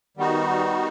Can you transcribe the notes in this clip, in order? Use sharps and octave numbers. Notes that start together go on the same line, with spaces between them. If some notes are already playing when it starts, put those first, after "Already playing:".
D#3 G3 B3 D#4 F#4